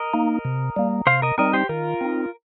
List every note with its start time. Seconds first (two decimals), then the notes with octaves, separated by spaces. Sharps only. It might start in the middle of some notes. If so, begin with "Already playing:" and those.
Already playing: A#4 D#5
0.14 A#3 D#4
0.45 C3
0.76 G3 A#3
1.07 C3 C5 F5
1.22 A#4 D#5
1.38 G3 C4 D#4 A#4 D#5
1.53 G4 C5
1.69 D#3 F4 A#4
2.01 C4 D#4